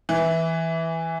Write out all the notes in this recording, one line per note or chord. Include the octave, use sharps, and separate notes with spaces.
E3